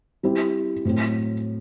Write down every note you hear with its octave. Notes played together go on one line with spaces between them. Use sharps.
G3 C4 E4 G4
A2 F#3 C4 F#4